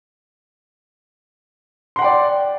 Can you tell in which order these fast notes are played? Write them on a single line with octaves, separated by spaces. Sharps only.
C6 F#5 G5 D5